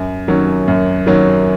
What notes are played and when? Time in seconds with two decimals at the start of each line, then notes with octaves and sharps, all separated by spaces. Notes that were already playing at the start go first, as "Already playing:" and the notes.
Already playing: F#2
0.28 D#3 F#3 C#4
0.68 F#2
1.07 D#3 F#3 C#4